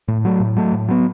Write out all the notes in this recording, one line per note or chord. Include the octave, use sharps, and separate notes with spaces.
A2
F#3 A3
A2
F#3 A3
A2
F#3 B3